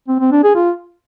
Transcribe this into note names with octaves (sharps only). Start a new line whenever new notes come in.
C4
C4
D4
G#4
F4